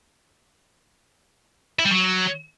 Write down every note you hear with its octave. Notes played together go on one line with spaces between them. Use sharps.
E4
G3
F#3